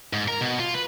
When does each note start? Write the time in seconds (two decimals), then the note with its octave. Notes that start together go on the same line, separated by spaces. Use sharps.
0.13 G#2
0.28 A#4
0.41 B2
0.60 F4
0.74 B4